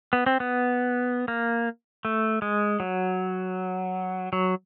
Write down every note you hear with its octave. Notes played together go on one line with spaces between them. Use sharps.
B3
C4
B3
A#3
A3
G#3
F#3
F#3